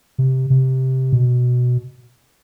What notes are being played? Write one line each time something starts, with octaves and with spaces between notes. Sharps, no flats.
C3
C3
B2